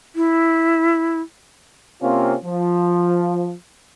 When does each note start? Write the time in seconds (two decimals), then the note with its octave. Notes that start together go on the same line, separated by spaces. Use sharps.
0.16 E4
2.02 C3 A#3 C4 C#4 F4
2.45 F3